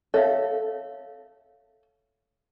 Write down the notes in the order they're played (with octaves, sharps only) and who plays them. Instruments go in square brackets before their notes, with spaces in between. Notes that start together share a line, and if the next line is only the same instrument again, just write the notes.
[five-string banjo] A4 [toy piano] C#5 E5 F5